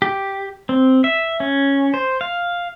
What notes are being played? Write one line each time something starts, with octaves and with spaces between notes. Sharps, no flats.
G4
C4
E5
C#4
C5
F5